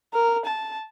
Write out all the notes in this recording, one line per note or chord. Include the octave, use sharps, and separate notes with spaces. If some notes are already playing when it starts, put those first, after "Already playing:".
A#4
A5